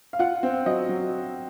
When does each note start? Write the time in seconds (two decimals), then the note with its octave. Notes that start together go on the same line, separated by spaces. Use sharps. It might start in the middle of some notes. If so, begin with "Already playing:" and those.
0.13 F5
0.19 F4 F#5
0.43 C4
0.66 F#3 D#5
0.89 F#3